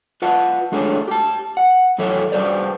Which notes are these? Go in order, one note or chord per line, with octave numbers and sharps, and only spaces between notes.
F4 B4 F#5 A5
G#3 A3 D4 G#4 A4 C#5
G4 A5
F#5
F#2 E3 A4 C#5 E5
G3 G#4 B4 C5 D5